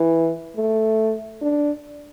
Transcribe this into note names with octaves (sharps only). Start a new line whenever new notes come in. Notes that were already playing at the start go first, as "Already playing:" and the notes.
Already playing: E3
A3
D4